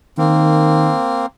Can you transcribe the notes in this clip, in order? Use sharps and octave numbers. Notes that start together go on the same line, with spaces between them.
D#3 A#3 C4